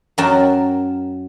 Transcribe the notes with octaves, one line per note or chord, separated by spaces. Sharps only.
F#2 F#3 F#4 A#4 G5 A5